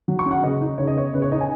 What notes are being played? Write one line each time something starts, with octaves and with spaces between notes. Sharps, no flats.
F#3
C#6
C#4
F#5
C#3 D#5
D#4
C#3 C#5
D#5
B3 C#5
C#3 B4
C#5
D#4 D#5
G#5